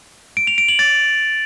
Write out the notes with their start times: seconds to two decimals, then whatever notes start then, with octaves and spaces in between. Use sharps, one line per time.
0.37 D7
0.47 F7
0.58 D7
0.68 F#7
0.79 A6